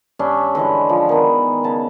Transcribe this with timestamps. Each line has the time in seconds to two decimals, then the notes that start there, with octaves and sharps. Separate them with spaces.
0.19 G2 C#4 D4 E5
0.55 D3 E3 G#3
0.89 F3
1.09 D#3 B3
1.64 C#3 A5